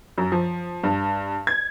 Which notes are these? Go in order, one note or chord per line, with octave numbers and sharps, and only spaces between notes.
F#2
F3
G2
G#6